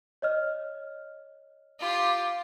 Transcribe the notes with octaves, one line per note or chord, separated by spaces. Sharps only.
C#5 D#5 F6
F4 G4